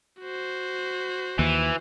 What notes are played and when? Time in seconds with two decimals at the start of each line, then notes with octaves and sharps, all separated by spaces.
0.21 F#4 C5
1.39 D#2 E3